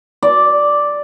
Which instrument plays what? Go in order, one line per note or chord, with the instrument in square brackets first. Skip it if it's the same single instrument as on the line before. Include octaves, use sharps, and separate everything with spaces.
[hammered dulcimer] D5